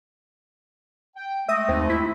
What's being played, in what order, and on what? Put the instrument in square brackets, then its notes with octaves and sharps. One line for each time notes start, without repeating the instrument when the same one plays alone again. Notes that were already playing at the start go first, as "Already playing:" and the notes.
[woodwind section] G5
[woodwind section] G#3 A3 [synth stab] E5 D#6 A#6
[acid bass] D#2 [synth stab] C4
[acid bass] E4 [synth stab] B6